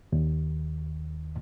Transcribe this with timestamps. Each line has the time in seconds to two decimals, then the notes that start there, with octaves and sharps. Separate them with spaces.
0.12 D#2